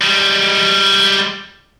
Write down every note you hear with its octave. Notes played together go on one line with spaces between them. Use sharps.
G3 G#3